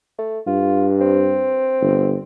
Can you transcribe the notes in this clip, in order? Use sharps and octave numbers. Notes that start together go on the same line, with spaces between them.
A3
G2 F4
C4
G1